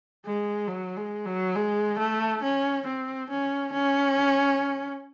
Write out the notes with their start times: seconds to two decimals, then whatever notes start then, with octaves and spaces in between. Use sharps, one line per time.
0.25 G#3
0.68 F#3
0.96 G#3
1.26 F#3
1.55 G#3
1.98 A3
2.43 C#4
2.87 C4
3.30 C#4
3.73 C#4